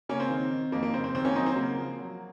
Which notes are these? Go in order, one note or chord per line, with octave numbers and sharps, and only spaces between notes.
C#3 A#3 C#4
C4
D#3
D#3
F2 A#3
A#3
C#3 C4
C4
D#2 C4
A#3 C#4
F#3 C4 D#4
C4
C#3 A#3
F3
F#3